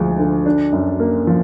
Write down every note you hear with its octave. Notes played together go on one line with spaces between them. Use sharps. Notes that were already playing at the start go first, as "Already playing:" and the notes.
Already playing: D2 F3 G#3
D3
D4
F#2
A#3
F3